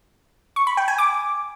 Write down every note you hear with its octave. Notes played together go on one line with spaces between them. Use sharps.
C#6
B5
G5
G#5
D6